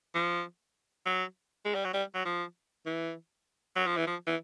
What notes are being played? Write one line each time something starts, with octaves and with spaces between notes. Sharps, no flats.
F3
F#3
G#3
G3
F#3
G3
F#3
F3
E3
F#3
F3
E3
F3
E3